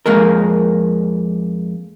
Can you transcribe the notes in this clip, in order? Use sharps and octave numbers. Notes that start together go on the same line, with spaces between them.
F2 G#3 A#3 A#4